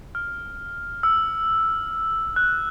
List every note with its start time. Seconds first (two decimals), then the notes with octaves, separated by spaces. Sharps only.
0.15 F6
1.03 E6
2.36 F#6